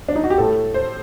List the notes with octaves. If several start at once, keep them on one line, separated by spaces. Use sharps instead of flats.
D4
D#4
F#4
G4
A2 A3 A4
C5